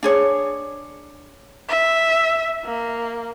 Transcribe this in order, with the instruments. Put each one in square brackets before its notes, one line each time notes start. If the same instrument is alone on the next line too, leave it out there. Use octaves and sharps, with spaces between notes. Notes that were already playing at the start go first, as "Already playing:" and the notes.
[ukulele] D4 G#4 C#5
[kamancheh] E5
A#3